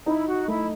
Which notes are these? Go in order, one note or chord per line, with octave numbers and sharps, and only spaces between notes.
D#4 E4
F#4
A3 E4